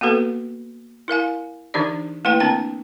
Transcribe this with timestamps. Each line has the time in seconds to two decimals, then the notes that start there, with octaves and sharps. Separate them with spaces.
0.01 A#3 B3 F#4 A4 B4
1.08 E4 A#4 F5 G#5
1.74 D3 E3 D4 D#4 G4 D5
2.25 A3 A#3 E4 B4 G5
2.40 D3 C4 D4 G5